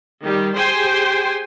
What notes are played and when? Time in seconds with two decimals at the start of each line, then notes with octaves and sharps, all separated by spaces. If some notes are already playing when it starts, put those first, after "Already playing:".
0.22 D#3 G3 G4
0.54 G4 G#4 C5 G5 G#5 C6